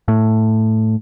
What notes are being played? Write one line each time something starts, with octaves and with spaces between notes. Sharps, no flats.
A2